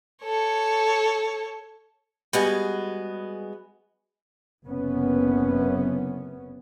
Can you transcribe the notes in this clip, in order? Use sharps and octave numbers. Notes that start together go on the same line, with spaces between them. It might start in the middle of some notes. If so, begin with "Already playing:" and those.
A4 C#5
G3 G#3 B3 F#4 G#4
F#1 C3 B3 C#4